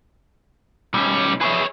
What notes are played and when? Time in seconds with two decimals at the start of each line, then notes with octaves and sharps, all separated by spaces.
0.94 B1 G3 C#4
1.41 G#4 B4 C#5 E5